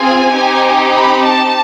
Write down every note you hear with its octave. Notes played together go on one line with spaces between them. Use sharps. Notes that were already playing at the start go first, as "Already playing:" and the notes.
Already playing: C4 F4 G#4 G#5
C4 D#4 G4
B5
A5